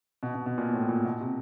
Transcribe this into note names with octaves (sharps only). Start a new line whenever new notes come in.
B2
B2
B2
A#2
A2
A#2
B2
C3